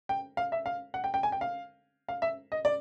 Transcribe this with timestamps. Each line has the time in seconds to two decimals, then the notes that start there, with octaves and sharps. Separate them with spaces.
0.09 G5
0.37 F5
0.52 E5
0.66 F5
0.94 F#5
1.04 G5
1.14 G5
1.23 G#5
1.32 G5
1.41 F5
2.09 F5
2.22 E5
2.52 D#5
2.65 D5